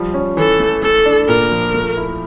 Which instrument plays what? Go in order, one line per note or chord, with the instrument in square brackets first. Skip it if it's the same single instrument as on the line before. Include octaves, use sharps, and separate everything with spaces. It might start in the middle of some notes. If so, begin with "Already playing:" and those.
Already playing: [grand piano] F3 G3
C#4
[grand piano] E3 [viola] A4
[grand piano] A3
[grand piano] A3 [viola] A4
[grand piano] D4
[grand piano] A#2 [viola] A#4
[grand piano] F3
A3
E4